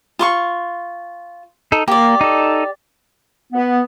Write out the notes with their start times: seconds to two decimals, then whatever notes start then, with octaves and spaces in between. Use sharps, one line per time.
0.19 F4 C6 C#6
1.72 D#4 A4
1.88 A#3 G4 D5
2.21 D#4 A4
3.53 B3